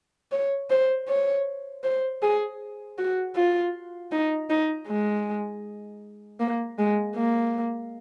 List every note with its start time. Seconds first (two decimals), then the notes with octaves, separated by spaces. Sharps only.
0.32 C#5
0.70 C5
1.08 C#5
1.84 C5
2.22 G#4
2.98 F#4
3.36 F4
4.12 D#4
4.50 D#4
4.87 G#3
6.40 A#3
6.78 G#3
7.16 A#3